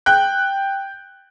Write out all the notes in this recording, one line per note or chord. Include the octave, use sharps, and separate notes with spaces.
G5 F#6